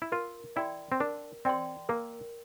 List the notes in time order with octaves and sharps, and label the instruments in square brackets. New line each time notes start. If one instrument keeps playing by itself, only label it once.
[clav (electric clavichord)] E4
[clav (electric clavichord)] F4 [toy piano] A#4
[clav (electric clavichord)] E4 [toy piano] D5 G5 C6
[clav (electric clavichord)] C4
[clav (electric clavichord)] D4 [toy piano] A#4
[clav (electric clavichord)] C4 [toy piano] D5 G5 C6
[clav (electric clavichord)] A#3 [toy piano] A#4